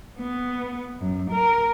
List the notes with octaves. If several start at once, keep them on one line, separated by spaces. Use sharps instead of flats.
B3
F#2
A#4